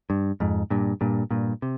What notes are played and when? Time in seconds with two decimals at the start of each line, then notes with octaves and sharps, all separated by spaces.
0.10 G2
0.40 F2 G#2
0.70 G2 A#2
1.01 G2 A#2
1.31 G2 A#2
1.62 C3